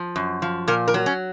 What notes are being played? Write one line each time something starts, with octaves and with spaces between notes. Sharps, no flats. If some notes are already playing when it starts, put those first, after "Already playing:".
Already playing: F3
F#2
F3
A#2 A#4
A#4
F#3
C#4